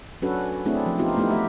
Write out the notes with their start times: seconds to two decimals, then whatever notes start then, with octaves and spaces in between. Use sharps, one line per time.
0.22 F#3 C#4 D4 F#4 A4 B4
0.65 A3 C4 D4 E4 G#4
0.86 F3
0.99 B3 D#4 F4 G4
1.17 A3 B3 D#4 E4 G4
1.30 A3 G4 E5